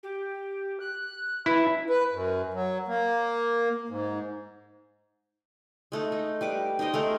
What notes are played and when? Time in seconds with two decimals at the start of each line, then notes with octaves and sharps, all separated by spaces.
0.03 G4
0.80 F#6
1.46 E4 B4
1.90 B4
2.12 F#2
2.54 F#3
2.88 A#3
3.89 G#2
5.92 G#3 A3 D#4
6.12 D#4
6.41 G3 B4 D6
6.79 D#4 A#4 C5 D#5
6.94 A3 G#4 A#4